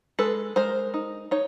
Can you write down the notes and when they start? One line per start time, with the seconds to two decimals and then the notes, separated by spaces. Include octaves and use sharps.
0.19 G#3 A4 B4
0.56 G#3 A#4 C5
0.94 D#4
1.31 D#4 C#5